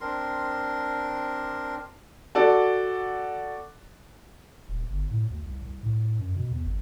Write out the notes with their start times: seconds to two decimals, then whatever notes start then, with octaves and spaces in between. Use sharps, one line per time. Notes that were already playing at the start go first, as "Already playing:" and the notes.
0.01 C4 D4 A#4 C6
2.35 F#4 A4 D5
4.68 D#1
4.89 G1
5.10 A2
5.30 D2
5.45 C2
5.62 C2
5.83 A2
6.19 F#2
6.35 B2
6.51 E2
6.64 G#1